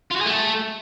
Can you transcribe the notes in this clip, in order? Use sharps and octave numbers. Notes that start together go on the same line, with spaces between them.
F4
F#4
G#4
A3